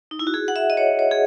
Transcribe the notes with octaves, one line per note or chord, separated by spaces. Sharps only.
D#4
E4
F#4
G#4
F#5
E5
D#5
C#5
C#5
G#4